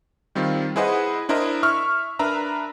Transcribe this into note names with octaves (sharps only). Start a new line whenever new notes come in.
D#3 G3 C4 F4
E4 G#4 B4 C5 D#5 F#5
D4 E4 A#4 C5 D#5
E5 C#6 F6
D4 A#4 B4 E5 A#5